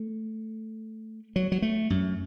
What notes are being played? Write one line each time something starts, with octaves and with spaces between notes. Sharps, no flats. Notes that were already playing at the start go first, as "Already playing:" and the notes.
Already playing: A3
F#3
F#3
A3
F#2